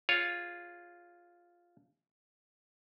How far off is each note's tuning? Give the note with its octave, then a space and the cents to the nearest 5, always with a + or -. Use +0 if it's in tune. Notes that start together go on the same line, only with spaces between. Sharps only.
F4 +0 G#4 +0 C#5 +0